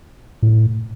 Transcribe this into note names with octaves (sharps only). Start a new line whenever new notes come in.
A2